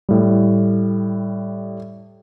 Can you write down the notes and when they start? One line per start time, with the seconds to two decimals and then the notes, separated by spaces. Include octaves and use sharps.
0.09 A2 G3